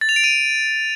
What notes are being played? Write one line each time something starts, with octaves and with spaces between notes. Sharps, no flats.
A6
F7
D7
D#7